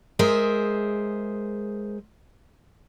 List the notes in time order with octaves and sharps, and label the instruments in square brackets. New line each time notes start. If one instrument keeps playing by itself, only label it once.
[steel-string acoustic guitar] G#3 G#4 A#4 C5 E5